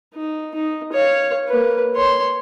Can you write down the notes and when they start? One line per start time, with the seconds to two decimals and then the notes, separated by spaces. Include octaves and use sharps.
0.16 D#4
0.55 D#4
0.93 C#5 F5
1.49 A#3 B4
1.95 C#5 C6